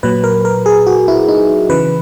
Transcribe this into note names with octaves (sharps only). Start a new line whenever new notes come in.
A#2 F#3 B4
A#4
A#4
G#4
F#4
E4
D#4
C#3 E3 B4